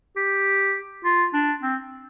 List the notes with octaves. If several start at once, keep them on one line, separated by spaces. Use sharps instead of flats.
G4
F4
D4
C4